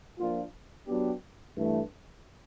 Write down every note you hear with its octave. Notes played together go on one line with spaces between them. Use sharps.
F3 A#3 D4 F4
F#3 B3 D4 G4
G2 E3 A3